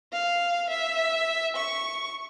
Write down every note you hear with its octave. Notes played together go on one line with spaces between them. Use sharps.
F5
E5
C#6